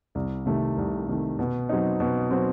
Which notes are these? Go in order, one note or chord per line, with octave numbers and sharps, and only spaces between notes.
C2
C3 D#3 A3
C2
C3 D#3 A3
B2
F#3 C4 D#4
B2
F#3 C4 D#4